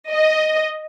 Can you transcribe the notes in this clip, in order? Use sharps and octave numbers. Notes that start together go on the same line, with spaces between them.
D#5